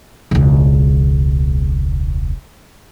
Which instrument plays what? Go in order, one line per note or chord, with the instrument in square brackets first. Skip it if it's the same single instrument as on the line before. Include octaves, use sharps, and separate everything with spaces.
[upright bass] E1 C#2